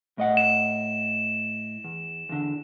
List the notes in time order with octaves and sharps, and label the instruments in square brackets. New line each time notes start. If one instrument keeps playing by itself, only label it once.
[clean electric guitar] A2 D#5 F#5
[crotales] E7
[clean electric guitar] E2
E2 D3